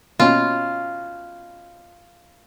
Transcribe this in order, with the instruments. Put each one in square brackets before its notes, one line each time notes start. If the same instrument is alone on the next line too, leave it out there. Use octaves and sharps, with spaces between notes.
[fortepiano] B2 C#4 [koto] F4